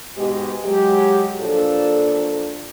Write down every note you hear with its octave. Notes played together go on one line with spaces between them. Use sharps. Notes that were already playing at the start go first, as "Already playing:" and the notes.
G#2 B2 G#3 G4
F#3 G#3 G4
A#2 F3 D4 A4